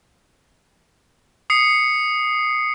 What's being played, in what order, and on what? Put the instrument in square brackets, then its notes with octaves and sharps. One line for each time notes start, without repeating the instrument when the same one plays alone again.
[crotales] D#6 C7 C#7